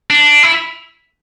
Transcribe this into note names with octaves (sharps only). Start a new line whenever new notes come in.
D4
E4